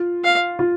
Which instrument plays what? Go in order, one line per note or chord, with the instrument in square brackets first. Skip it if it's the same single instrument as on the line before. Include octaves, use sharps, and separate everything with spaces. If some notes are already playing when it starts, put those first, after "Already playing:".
Already playing: [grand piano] F4
[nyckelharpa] F5
[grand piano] F4